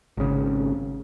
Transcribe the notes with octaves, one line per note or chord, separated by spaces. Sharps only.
G#1 C#3